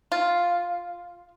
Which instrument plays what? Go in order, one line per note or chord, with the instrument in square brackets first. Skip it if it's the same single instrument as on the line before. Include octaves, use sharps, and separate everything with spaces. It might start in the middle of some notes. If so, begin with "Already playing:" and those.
[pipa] F4